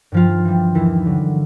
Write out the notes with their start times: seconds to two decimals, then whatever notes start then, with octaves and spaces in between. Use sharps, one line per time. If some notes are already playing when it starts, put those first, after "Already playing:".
0.12 G2 F3 F4
0.45 E3 G3
0.74 D#2 E3 E4
1.06 D3 F#3